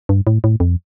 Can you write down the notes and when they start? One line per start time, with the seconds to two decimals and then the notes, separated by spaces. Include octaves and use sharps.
0.09 G2
0.27 A2
0.44 A2
0.60 F2